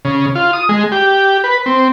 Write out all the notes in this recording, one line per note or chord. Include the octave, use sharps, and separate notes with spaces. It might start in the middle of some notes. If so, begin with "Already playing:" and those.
C#3
F4
D#6
G#3
G4
B4
C4